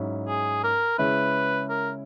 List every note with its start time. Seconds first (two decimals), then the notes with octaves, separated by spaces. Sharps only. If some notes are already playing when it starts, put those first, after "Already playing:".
Already playing: G#2 F#3 C#4 E4
0.28 G#4
0.64 A#4
0.98 C#3 G#3 C#4 E4 B4
1.69 A#4